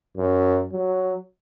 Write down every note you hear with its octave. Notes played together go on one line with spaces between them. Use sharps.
F#2
F#3